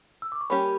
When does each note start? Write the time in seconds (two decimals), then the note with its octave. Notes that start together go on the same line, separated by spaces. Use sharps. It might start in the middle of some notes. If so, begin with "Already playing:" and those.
0.22 E6
0.32 D6
0.41 C#6
0.50 G3 A#3 C#4 G4 B5